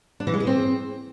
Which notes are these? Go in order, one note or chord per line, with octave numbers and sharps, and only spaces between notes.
D4
E3
G#3
G#4
C4